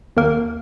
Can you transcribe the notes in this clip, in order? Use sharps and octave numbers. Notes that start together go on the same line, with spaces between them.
D#2 D#3 A#3 A#4